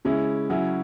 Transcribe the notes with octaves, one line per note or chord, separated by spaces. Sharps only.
C#3 G#3 C#4 E4
C#3 F#3 C#4 E4